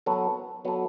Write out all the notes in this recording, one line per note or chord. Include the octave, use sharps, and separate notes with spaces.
F#3 B3 F#4 A4
F#3 B3 F#4 A4